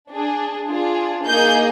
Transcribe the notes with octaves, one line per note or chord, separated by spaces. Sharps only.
D4 G#4
D4 F4 G#4
A#3 D#4 G#4 G6